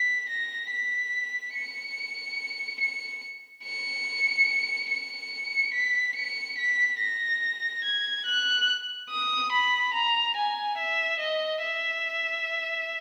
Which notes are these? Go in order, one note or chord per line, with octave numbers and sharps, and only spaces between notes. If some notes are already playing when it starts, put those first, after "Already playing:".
Already playing: B6
A#6
B6
C#7
C#7
C#7
C#7
B6
C#7
B6
A#6
G#6
F#6
D#6
B5
A#5
G#5
E5
D#5
E5